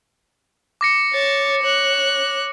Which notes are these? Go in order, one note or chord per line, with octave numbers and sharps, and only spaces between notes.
D6 A#6 C#7
C#5 A6
C#5 F#6